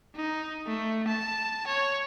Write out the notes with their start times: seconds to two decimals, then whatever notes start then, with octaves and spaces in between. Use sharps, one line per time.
0.16 D#4
0.67 A3
1.08 A5
1.67 C#5